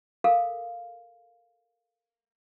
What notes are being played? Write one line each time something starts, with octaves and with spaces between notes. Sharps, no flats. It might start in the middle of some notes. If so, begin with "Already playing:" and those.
A4 A#4 F5